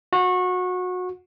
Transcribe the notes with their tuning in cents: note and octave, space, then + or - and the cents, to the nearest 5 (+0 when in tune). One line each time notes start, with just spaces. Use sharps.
F#4 -25